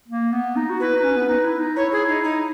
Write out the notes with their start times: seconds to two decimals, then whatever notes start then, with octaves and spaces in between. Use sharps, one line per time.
0.08 A#3
0.32 B3
0.56 D#4
0.70 F#4
0.80 E4 B4
0.92 D#4
1.04 C#4
1.16 B3
1.28 D#4
1.44 E4
1.60 D#4
1.76 E4 C#5
1.92 G#4
2.08 D#4
2.23 D#4